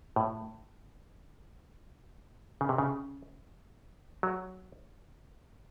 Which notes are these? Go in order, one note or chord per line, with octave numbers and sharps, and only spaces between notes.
A2
C#3
C3
C#3
F#3